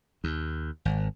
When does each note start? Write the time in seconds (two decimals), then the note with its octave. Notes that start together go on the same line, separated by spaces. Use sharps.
0.24 D#2
0.85 G#1